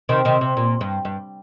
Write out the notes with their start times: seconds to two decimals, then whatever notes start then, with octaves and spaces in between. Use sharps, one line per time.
0.09 C3 D#3
0.25 C3 D#3
0.41 C3
0.57 A#2
0.81 G2
1.05 G2